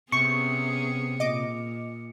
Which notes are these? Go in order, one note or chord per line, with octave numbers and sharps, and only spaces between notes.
C3 B3 C#4 G#4 C#6 C#7
A#2 D#5 D6